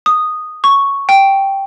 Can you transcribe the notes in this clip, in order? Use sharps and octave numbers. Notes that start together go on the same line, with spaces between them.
D#6
C#6
G5